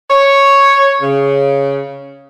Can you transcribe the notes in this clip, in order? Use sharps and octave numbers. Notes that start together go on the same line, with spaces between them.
C#5
C#3